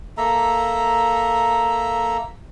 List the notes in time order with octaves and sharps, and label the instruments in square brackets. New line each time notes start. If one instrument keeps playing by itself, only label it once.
[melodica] A#3 A4 E5 A#5